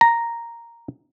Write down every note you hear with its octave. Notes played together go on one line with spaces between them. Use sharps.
A#5